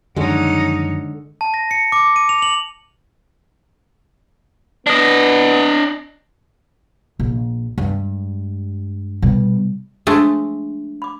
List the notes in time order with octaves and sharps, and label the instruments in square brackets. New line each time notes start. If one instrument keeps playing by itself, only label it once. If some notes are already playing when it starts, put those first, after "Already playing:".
[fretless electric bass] F#2 D#3 F3 [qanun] D3 G#3 [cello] C#4 D#4
[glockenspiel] A5
A#6
C#7
D6
D#7
F7
F#7
[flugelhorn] B3 [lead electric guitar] D4 D#5
[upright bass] A#1
G2 G#3
B2 G3
[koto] F3 G#3 A3 [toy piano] D4
[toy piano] B5 D6